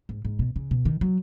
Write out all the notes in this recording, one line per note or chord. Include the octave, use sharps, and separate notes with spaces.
G#2
G#2
B2
C#3
B2
D#3
F#3